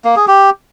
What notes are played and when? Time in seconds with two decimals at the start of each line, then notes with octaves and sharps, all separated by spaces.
0.05 A#3
0.16 G#4
0.28 G4